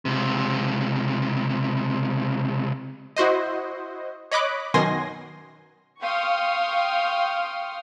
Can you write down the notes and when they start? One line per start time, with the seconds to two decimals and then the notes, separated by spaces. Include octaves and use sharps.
0.05 C#2 C3
3.16 E4 F#4 C5 D#5
4.32 C#5 D#5 B5 D6 F#6
4.74 F#2 B2 D#3 G#5 C6 A#6
6.01 F5 G5 C6 C#6 D#6 F6